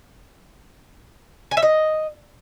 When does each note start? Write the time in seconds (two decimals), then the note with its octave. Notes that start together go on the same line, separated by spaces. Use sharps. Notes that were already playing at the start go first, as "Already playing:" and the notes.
1.51 G#5
1.57 E5
1.62 D#5